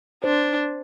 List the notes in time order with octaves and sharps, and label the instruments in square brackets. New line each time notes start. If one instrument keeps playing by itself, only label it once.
[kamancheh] D4 [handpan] C5